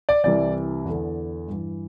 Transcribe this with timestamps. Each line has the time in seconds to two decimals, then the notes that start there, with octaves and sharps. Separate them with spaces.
0.09 D5
0.24 C2 C3 E3 D5
0.85 E2 D3
1.48 G2 E3